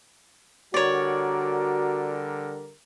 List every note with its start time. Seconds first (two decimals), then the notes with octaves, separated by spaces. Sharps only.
0.74 D3 G3 F#4 A#4 C#5 D5